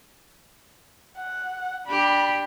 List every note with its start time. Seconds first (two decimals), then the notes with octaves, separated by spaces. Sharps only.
1.18 F#5
1.87 D4 G4 B5